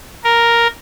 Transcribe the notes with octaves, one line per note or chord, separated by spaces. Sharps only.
A#4